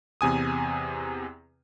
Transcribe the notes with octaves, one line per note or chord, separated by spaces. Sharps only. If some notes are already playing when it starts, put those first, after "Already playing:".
E2 C3 G#5 D#6